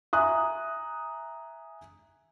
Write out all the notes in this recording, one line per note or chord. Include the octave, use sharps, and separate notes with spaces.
E5 G#5 A#5 D#6 F#6